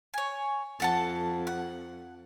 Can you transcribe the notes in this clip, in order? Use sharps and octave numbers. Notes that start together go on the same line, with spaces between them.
C#5 G#5
F2 A4 F#5 A5
F#5